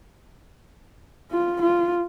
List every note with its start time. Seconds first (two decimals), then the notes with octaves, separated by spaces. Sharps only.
1.32 F4
1.62 F4